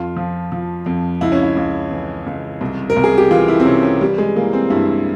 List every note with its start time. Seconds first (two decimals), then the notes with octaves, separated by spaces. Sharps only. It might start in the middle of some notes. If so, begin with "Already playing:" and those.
Already playing: F2 F4
0.16 F3
0.52 F3
0.86 F2
1.21 C#2 E4
1.32 C#4
1.43 E4
1.56 C#2
1.91 E3
2.27 C#2
2.61 C2
2.90 A#4
2.96 C2
3.04 G#4
3.18 G4
3.31 E3 F4
3.48 E4
3.60 C4
3.65 C3 C#4
3.83 C#4
4.01 E3 G3
4.18 G#3
4.36 E3 A#3
4.53 C4
4.70 G2 E4